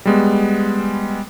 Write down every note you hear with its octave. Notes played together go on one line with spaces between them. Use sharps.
G3 G#3 B3